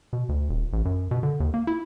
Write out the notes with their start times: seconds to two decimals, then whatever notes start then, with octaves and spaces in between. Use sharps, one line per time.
0.13 B2
0.29 D2
0.49 D#1
0.73 A1
0.85 F#2
1.11 B2
1.23 D3
1.40 D#2
1.54 A#3
1.67 E4